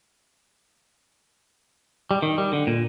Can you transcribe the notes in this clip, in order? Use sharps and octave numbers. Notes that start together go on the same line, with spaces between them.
G3
D#3
G3
D3
A#2